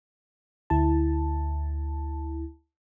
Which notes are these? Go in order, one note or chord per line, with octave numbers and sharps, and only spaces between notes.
D2 E4 A5